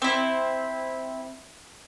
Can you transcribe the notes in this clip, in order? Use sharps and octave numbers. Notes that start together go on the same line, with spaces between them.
C4 E4